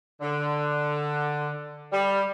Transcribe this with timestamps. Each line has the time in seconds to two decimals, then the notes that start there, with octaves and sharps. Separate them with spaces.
0.21 D3
1.92 G3